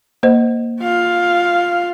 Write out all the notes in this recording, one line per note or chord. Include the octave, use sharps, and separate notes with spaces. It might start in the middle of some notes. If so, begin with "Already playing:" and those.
A#3 C5 D#5
F4 F5